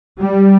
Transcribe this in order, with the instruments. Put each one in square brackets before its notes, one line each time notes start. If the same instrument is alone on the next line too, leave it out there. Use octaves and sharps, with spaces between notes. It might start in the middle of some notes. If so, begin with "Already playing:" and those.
[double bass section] G3